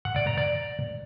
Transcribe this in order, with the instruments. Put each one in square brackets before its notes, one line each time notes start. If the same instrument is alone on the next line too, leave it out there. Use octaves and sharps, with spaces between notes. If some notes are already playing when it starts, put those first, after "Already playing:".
[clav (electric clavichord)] F#5
D5
A#5
D5